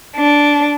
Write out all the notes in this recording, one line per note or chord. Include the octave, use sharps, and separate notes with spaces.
D4